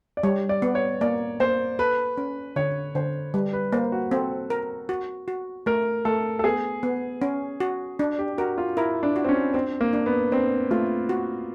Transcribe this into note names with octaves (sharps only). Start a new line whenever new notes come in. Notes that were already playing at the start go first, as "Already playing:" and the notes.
D5
G3 C#5
D5
B3
C#5
A#3 D5
A#3 C5
A4 B4
C#4
D3 C#5
D3 C5
G3 B4
B4
A#3 C5
F#4
C4 A4
A#4
F#4
F#4
A3 A#4
A3 A4
A4
B3 G#4
B3
C#4
F#4
D4
G4
F#4 A#4
F4
E4 A#4
D4
F#4
C4
C#4
C4 D4
A#3
D4
B3
C4 D4
A3 F4
F#4